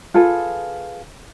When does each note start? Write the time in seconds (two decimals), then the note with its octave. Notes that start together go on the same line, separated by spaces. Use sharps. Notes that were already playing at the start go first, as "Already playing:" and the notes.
0.14 F4 G#4 A4 B4